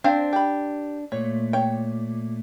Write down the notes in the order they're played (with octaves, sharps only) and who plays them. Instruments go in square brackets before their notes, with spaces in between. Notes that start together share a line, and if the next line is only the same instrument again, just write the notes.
[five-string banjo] C4 C5 F5 [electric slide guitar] D4
[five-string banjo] G4 B5
[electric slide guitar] A#2 A3 [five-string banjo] C#5
[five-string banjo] C#5 G5